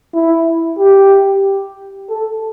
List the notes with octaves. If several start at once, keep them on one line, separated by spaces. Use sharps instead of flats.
E4
G4
A4